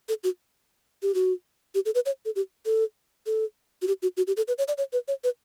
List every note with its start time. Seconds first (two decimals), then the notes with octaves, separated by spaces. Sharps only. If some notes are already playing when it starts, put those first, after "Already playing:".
0.09 A4
0.24 F#4
1.02 G4
1.15 F#4
1.75 G4
1.85 A4
1.95 B4
2.06 C#5
2.25 A4
2.36 G4
2.66 A4
3.26 A4
3.82 F#4
3.87 G4
4.02 F#4
4.17 F#4
4.27 G4
4.37 A4
4.48 B4
4.58 C#5
4.68 D5
4.78 C#5
4.93 B4
5.08 C#5
5.24 B4